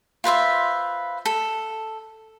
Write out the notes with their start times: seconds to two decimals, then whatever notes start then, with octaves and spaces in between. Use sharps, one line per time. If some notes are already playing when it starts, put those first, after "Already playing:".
0.24 F4 B4 C5 E5
1.26 A4